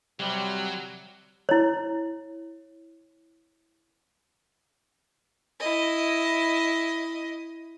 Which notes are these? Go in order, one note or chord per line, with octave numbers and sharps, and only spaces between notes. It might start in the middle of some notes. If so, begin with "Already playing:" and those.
C3 F#3 G3
E4 C#5
E4 D#5